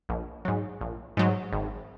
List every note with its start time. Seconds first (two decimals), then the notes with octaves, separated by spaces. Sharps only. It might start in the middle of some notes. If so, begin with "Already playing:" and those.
0.09 A#1
0.45 G#2 F#3
0.81 A#1
1.17 G#2 F#3
1.53 G#1